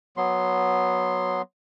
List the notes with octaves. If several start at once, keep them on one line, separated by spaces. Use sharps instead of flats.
F#3 B3 C6